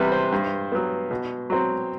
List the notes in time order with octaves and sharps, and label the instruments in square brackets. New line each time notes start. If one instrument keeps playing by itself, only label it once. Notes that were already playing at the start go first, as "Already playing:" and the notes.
Already playing: [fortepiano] E2 C3 G3 B4
C5
G2
F#3 B3
B2
F#3 C4